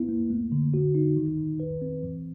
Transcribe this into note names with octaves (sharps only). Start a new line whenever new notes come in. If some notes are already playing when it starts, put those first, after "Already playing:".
Already playing: B3 E4
A#3
A3
D3
F#4
D#4
D#3
D#3
B4
C4
E3